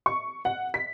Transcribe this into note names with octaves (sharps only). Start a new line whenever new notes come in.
C#6
F#5
B6